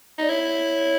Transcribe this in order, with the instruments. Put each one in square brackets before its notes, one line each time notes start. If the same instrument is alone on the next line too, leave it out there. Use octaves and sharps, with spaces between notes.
[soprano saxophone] D#4 [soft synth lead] D5
[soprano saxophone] E4 [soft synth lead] C#5